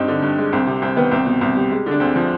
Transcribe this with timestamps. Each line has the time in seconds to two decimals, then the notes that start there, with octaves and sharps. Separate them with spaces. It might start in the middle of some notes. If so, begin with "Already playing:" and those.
Already playing: G2 C4 D#4
0.08 D3
0.22 G2
0.38 G#3
0.53 C2 C4
0.67 C3
0.82 C2 C4
0.96 D#3 B3
1.11 C2 C4
1.26 B2
1.41 C2 C4
1.56 G3
1.71 G#3
1.86 D3
1.91 D4
2.00 D2 C4
2.16 F3